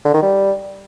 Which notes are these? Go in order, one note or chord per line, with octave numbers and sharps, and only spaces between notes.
D3
D#3
G3